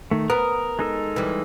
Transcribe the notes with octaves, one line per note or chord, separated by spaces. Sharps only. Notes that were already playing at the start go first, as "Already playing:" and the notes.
D#3 A3
B3 A#4 D#6
G#3 D#4 A4
E3 G3